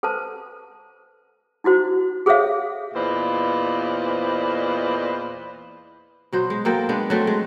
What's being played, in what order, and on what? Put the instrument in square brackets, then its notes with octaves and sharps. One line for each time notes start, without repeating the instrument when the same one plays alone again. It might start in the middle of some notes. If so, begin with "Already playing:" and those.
[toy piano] A4 B4 C5 A5
D#4 E4 F#4 C5
G#4 A4 C5 C#5 E5 F5
[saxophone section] E2 A#2 B4 C5 D5 D#5
[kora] B2 F#3 C5
G#3
F#3 A#3 A4 G5
G#3 B3 D4
F#3 A3 C4
G#3